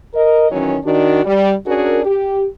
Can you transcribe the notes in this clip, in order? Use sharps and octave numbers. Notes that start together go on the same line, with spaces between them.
A#4 D#5
D#3 E3 F#3 C#4
D#3 D4 F#4
G3
C#4 D4 F#4 G#4 A#4
G4